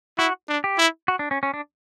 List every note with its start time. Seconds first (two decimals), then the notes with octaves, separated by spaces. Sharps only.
0.18 E4 F#4
0.49 D4
0.64 G4
0.78 E4
1.08 F#4
1.19 D4
1.31 C#4
1.43 C#4
1.54 D4